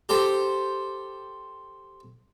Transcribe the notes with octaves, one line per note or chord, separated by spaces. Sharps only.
G4 A4 C5